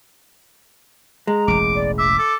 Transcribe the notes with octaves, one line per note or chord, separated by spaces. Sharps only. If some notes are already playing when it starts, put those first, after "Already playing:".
G#3 A#5
E1 A1 D6
D5
E5 D6
A4